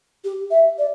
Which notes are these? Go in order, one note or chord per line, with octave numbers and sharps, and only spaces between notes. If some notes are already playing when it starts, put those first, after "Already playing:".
G4
E5
D5